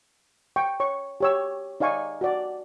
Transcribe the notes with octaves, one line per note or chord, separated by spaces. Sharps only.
G5 C#6
C#5 C#6
G4 C#5 E6
D#4 D5 F5 G#5 C#6
F#4 D5